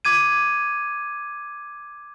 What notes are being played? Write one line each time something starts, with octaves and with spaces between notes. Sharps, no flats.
D6 G#6 D#7